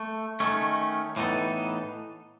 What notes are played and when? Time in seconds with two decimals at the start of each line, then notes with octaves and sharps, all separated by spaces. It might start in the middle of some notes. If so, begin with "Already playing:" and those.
Already playing: A3
0.40 D#3 A3 C#4
1.16 A2 E3 B3 D#4 A4